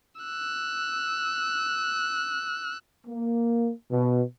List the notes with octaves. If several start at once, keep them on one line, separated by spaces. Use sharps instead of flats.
E6 F#6
A#3
B2